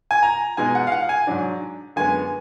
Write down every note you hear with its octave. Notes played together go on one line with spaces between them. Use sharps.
G#5
A#5
B2 G#3 D#4 G#5
F#5
F5
F#5
G#5
G#2 F#3 D4
F#2 D3 G#3 B3 G#5